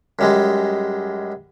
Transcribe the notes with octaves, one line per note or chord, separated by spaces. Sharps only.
F#2 G3 G#3